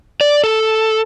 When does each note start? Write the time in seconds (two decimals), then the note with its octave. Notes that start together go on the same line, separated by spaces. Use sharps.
0.21 D5
0.44 A4